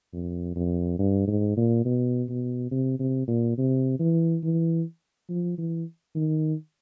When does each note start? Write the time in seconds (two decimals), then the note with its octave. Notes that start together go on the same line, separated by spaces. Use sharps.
0.13 F2
0.56 F2
0.99 G2
1.28 G#2
1.57 A#2
1.85 B2
2.29 B2
2.71 C3
3.00 C3
3.28 A#2
3.58 C3
4.00 E3
4.44 E3
5.30 F3
5.58 E3
6.15 D#3